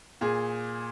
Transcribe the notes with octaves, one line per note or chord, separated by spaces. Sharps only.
A#2 G#4